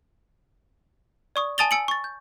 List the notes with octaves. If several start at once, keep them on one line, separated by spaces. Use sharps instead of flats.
D5 C#6 D#6
G#5 A5 D#6 A6 F7 G7
G#5 E6 C#7 D7 F#7
C#6 A6
G6